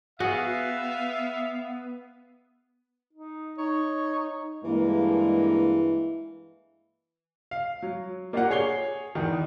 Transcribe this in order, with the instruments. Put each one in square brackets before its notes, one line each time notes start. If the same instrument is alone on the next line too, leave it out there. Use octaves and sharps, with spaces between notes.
[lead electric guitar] B3 [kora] F#4 G#4 [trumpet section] E5 F5
[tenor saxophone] D#4
[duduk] D#4 [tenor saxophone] C#5
[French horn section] G2 G#3 A#3 [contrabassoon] E3
[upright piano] F5
F#3
A#3 D4 F4 G4 F5 F#5
G#4 C#5 C7 G7
E2 D#3